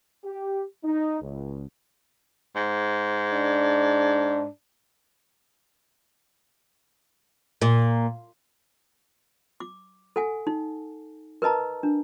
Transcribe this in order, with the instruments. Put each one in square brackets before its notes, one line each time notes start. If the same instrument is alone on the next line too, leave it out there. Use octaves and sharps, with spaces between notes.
[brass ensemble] G4
D#4
C#2
[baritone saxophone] G#2
[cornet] D4
[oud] A#2
[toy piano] D6
A4 F#5 G#5
D#4
A#4 B4 D#5 A5 A#5
D4